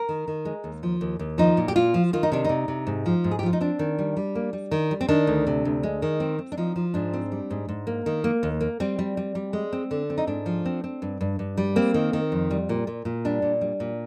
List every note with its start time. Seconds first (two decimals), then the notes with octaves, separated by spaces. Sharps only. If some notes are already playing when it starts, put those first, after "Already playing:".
Already playing: A#4
0.09 D#3
0.28 D#3
0.45 G#3
0.64 D#2
0.83 F3
1.01 D#2
1.19 D#2
1.38 F3 D#4
1.57 A#2
1.68 G4
1.76 A#2 F4
1.94 F3
2.13 D#3 F4
2.23 D#4
2.32 C3 D4
2.44 C3 D#4
2.68 C3
2.87 G#2
3.06 F3
3.24 G#2
3.31 G#4
3.39 G4
3.43 F3 F4
3.53 D#4
3.61 C4 D4
3.79 D#3
3.99 G3
4.17 G3
4.35 A#3
4.53 G3
4.71 D#3
4.91 G3
5.01 C4
5.08 D#3 D4
5.27 D2
5.47 C3
5.65 D2
5.83 G#3
6.02 D#3
6.20 C4
6.39 C4
6.52 D4
6.57 F3 D#4
6.76 F3
6.94 G#2 D4
7.13 C4
7.32 G3
7.51 G#2
7.69 G#2
7.87 A#3
8.06 D#3
8.24 A#3
8.43 D#2
8.61 A#3
8.80 G3 C4
8.99 G3
9.17 G3
9.35 G3
9.53 G#3
9.73 C4
9.91 D3
10.10 C4
10.18 D#4
10.27 G#2 D4
10.46 F3
10.66 C4
10.84 C4
11.02 G2
11.21 G2
11.39 G2
11.57 G3
11.76 A#3 C4
11.94 D#3
12.13 D#3
12.32 F2
12.51 G3
12.69 A#2
12.87 A#2
13.05 A#2
13.25 G3 D4
13.42 A#2
13.61 G3
13.80 A#2